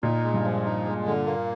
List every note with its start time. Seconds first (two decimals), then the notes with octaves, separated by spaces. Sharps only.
0.03 A#2 D#4
0.24 G#3
0.34 G2
0.44 F3
0.65 D#4
0.85 G#3
1.06 D3
1.26 A#3